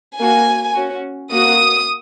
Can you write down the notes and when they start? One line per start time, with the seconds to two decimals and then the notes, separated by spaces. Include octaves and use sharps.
0.19 A#3 F#4 G#5
0.74 C#4 F#4
1.30 A#3 F#4 D#6